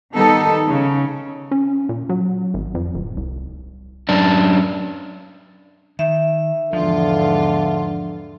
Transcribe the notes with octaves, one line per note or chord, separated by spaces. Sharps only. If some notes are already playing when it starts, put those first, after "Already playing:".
D#3 G3 B3 D#4 A4
C#3
C#4
A#2
F#3
G#1
F2
D1
C2
F#2 D4
D#3 E5
E2 G#2 D3 F3 F4